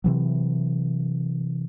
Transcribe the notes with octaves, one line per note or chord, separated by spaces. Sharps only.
C3 E3 F#3